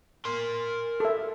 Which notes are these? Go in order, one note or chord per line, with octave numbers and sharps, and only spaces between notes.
A#4 C6
A4 E5